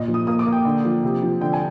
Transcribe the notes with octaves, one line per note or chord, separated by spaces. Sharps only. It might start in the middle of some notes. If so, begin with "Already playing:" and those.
Already playing: A#2 D#5
F3
D#6
A#3 D#6
D6
A#3
G5
D3
F3
C3
F3
D3 G5
G#5